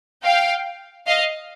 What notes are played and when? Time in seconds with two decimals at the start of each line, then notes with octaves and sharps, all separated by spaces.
0.25 F5 G5
1.07 D#5 F5